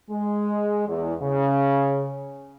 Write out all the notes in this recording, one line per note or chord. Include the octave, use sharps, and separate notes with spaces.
G#3
E2
C#3